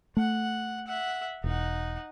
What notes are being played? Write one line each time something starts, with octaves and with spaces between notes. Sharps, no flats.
A3 F#5
E5 F#5
E1 D#4 F#5